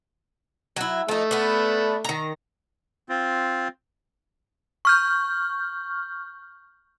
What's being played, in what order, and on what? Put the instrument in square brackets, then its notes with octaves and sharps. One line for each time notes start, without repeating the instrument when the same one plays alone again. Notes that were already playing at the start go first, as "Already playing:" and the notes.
[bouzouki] F#3 E4
[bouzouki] F3 D#4 [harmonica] A3
[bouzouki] B3 D4
D#3 A#5
[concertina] C4 F4
[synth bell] C#6 F6 G6